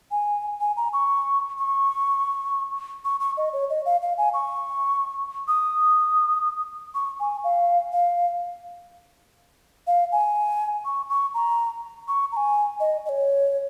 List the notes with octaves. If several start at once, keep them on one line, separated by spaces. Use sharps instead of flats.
G#5
G#5
A#5
C#6
C#6
C#6
C#6
D#5
C#5
D#5
F5
F5
G#5
C#6
D#6
C#6
G#5
F5
F5
F5
G#5
C#6
C#6
A#5
C#6
A#5
G#5
D#5
D#5
C#5